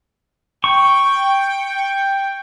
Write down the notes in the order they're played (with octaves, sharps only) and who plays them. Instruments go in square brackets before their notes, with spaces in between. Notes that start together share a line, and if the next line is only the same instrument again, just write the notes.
[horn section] G5 [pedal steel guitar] C#6